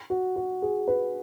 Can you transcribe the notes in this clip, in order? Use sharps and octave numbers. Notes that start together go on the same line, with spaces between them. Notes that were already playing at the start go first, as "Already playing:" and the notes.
F#4
F#4
G#4
B4